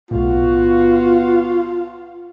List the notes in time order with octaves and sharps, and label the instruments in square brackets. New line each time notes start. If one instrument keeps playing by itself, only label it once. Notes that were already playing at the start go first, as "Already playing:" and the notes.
[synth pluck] B1 A2 [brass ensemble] B3 F#4 [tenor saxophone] F4